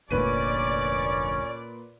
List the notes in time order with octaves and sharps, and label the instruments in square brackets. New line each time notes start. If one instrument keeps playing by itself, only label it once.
[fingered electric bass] F1 D2 [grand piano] A#2 B4 D#7 [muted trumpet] C#4 [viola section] D5